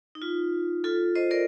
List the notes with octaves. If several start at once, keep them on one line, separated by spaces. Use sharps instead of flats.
D#4
F4
F4 A4
C5 D#5
A#4 D5